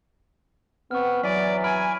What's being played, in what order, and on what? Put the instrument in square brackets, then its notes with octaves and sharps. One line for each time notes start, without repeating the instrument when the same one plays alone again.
[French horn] B3 [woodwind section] C4 [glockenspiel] C#6 F6
[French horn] E3 [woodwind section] F#3 [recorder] D5 [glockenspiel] G#5 B6
[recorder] G#5 [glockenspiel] B5 F6 D7